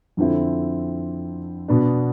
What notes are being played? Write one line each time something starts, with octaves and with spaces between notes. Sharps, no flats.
F2 D3 F3 C4 E4
B2 B3 D4